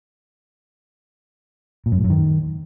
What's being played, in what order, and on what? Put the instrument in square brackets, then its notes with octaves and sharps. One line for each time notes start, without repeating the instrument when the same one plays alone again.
[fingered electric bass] A#2
F#2
A2
F#2
D#3